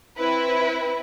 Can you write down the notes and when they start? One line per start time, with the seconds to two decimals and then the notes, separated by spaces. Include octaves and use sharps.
0.17 C4 E4 B4